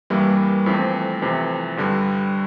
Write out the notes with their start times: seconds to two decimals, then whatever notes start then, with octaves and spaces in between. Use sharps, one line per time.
0.10 G2 E3 G3 A#3 E4
0.66 F2 E3 A3 C4
1.22 F2 C3 E3
1.77 G2 D3 G3